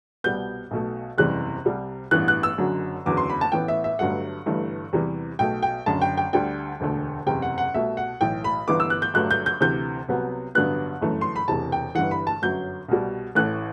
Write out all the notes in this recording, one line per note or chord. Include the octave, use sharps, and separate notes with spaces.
C2 B2 G3 B3 G6
B1 B2 A3
F#1 E2 C3 E3 G3 F#6
C2 C3 G3
A1 G2 E3 B3 F#6
F#6
E6
F#1 F#2 D3 F#3
F#1 E2 D3 F#3 B3 D6
C6
B5
A5
A1 A2 E3 B3 G5
E5
E5
G1 G2 F#3 A3 F#5
G1 G2 E3 A3
E2 C3 E3 G3
B1 B2 A3 G5
G5
F#1 F#2 D3 A5
G5
G5
D2 D3 G3 G5
E1 D2 D3 A3
F#1 E2 C3 G5
F#5
F#5
C2 B2 A3 E5
F#5
B1 A2 E3 G5
B5
G1 G2 E3 B3 D6
E6
F#6
G6
G1 G2 F#3 A3 F#6
G6
G6
D2 C3 E3 G6
C2 C3 F#3 B3
A1 G2 D3 F#3 B3 F#6
G1 F#2 E3 A3
C6
B5
E1 E2 C3 E3 A5
G5
G1 G2 E3 F#5
B5
A5
G1 F#2 F#3 G6
C2 B2 G3
A1 A2 E3 A3 F#6